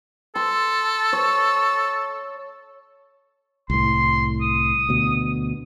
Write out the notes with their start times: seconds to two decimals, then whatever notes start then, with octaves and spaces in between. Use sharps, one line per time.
0.36 A4 C6
1.13 C#5
3.70 C2 A2 C6
4.41 D#6
4.89 D2 B2